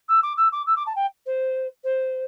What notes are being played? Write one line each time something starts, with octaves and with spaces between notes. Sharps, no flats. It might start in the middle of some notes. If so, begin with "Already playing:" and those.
E6
D6
E6
D6
E6
D6
A5
G5
C5
C5